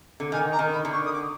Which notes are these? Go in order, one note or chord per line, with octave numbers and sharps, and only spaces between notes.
D3
D#3 G#5
A#5
D#3
B5
D3
C#6
D#6
D6